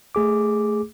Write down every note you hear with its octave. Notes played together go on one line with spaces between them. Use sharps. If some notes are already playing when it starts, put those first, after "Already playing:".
A3 G#4 D6